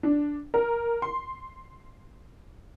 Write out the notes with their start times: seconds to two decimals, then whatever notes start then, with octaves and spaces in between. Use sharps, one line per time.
0.03 D4
0.54 A#4
1.02 C6